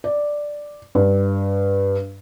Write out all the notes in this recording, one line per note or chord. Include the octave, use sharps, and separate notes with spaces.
D5
G2